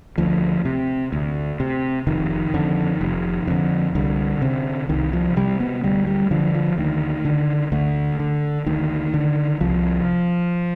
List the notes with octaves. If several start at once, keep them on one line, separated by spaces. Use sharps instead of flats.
D2 F3
C3
D2
C3
F1 D#3
F2 D3
F1
F2 D3
C2 D3
C3
C2 D#3
F3
C3 G3
B3
D2 G3
G3
D3 F3
F3
D2 D#3
D3
D2 D3
D3
D2 D#3
D3
C2 F3